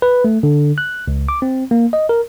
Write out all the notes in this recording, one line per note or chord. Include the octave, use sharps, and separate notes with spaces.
B4
A3
D3
F#6
C#2
D6
C4
A#3
D#5
A#4